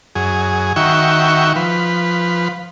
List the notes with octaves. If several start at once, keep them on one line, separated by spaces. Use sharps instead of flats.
F#2 G#4
D#3 F#4 E5 G5 C#6
F3 B4